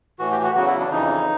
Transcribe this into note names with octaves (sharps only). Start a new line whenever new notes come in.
A2 E3 F#4
G4
F#4
E2 C#3 F#3 F#4
E4
D4
F2 C#3 E3 D#4